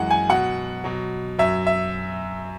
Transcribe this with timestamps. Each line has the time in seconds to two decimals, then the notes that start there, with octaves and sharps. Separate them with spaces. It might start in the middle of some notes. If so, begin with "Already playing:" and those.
Already playing: F#2 E3 G#3 F#5
0.11 G#5
0.29 B2 F#3 F#5
0.84 B2 F#3
1.39 F#2 F#3 E5
1.67 E5